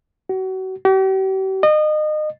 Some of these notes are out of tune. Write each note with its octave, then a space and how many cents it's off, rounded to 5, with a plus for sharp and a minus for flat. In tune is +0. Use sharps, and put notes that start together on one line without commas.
F#4 +30
G4 -40
D#5 -30